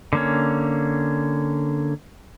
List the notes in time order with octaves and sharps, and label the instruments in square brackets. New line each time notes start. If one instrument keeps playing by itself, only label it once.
[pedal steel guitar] D3 A#3 C#4